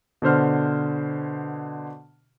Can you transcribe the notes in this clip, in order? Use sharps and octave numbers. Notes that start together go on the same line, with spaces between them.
B2 D3 C5 F6